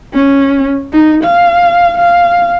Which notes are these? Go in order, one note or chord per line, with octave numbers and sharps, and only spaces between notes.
C#4
D#4
F5
F5